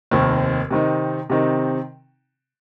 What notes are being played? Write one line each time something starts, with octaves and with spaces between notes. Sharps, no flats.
F1 D#2 D#3 C4
C3 D#3 C4 D#4
C3 D#3 C4 D#4